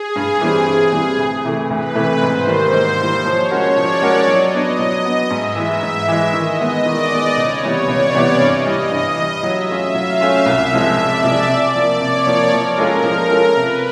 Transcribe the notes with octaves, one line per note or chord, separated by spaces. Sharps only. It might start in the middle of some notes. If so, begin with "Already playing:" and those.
Already playing: G#4
G2
E3 G3 C4
G2
E3 G3 C4
D2
C3 E3 A3
D2 B4
C3 E3 A3
G#2 C5
D#3 G3 A#3
G#2
D#3 G3 A#3
F3 C#5
G#3 C#4 F#4 A#4
F3 D5
G#3 C#4 F#4 A#4
F#3 D#5
B3 D4
F#3
B3 D4
G#2 E5
E3 G#3
G#2
E3 G#3
D#3 D#5
G#3 B3
D#3 D5
G#3 B3
C#2 C#5
C3 E3 G3 B3
C#2 D5
C3 E3 G3 B3
G2 D#5
E3 G3
G2
E3 G3
F#3 E5
A3 C#4 F4
F#3 F5
A3 C#4 F4
C2 E5
C3 F3 G#3
C2 D5
C3 F3 G#3
C3 D5
F3 A#3
C3 C#5
F3 A#3
F3 A#4
G#3 C#4 F4 A4
F3 A#4
G#3 C#4 F4 A4
C3 B4